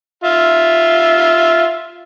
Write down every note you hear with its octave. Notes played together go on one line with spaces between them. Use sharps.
F4 E5